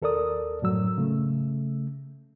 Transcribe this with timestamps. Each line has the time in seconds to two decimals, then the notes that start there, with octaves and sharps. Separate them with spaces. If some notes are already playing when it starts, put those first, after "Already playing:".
0.02 D#2 A4 A#4 D5 D#6
0.62 F#2 A2 F#3 E6
0.98 C#3 A3